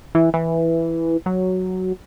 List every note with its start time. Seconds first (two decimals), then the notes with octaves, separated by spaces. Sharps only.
0.15 E3
0.34 E3
1.26 F#3